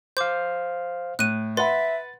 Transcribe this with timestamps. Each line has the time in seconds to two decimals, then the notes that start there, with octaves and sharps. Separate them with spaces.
0.17 C5 F5 D6 G6
1.19 A2 F#6 D#7
1.57 B4 E5 F#5 B5 C6 A6